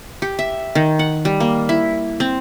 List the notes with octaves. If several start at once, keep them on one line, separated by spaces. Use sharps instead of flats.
G4
E5
D#3
F#5
G3
A#3
E4
C4